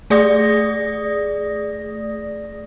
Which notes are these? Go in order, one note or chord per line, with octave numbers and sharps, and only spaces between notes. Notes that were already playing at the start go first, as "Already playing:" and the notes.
A3 G#4 D5 D#6 A#6